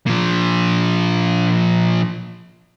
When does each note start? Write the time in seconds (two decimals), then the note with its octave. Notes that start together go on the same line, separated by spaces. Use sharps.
0.06 A#2 F3